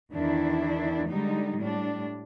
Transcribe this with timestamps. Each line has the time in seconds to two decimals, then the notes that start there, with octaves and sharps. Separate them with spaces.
0.13 E2 D#3 D4 E4
1.08 D3 G3 G#3 D#4
1.58 A2 G3 D4